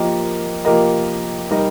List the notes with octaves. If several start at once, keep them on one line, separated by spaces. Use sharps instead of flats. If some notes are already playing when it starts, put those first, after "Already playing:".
Already playing: F3 A#3 G4 A#4 D#5
F3 A#3 G4 A#4 D#5
G3 D#4 A#4 D#5